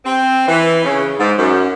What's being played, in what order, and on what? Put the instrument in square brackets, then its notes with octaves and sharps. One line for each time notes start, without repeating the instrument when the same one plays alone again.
[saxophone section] C4
E3
C#3
G#2
F#2